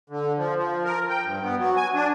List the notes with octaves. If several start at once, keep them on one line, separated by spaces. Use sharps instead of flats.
D3
F3
F3
A#4
G5
G2
B3
F#3
G#5
D4